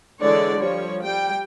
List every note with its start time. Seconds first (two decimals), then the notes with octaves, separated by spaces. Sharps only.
0.20 D3 E3 G#3 C#5 D5
0.59 F3 G3 C#5
1.02 G3 G5